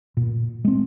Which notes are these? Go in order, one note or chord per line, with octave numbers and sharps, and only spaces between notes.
A#2
G#3 C4